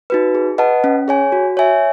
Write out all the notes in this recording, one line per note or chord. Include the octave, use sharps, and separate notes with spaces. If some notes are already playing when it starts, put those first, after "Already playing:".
D#4 F#4 B4
G#4
B4 D#5 F#5 A5
C#4
G#4 C#5 G#5
F#4
C#5 E5 G#5